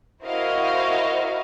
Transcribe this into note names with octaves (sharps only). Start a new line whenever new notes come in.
E4 F#4 A#4 C5 D#5 F5